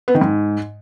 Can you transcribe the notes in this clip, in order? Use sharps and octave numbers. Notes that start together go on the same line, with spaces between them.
B3
D#3
G#2